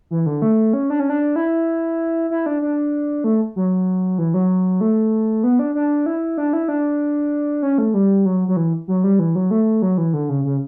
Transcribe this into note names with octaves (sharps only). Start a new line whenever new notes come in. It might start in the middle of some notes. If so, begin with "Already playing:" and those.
E3
D3
A3
C#4
D4
C#4
D4
E4
E4
D4
D4
A3
F#3
E3
F#3
A3
B3
D4
D4
E4
D4
E4
D4
C#4
A3
G3
F#3
F#3
E3
F#3
G3
E3
F#3
A3
F#3
E3
D3
C#3
C#3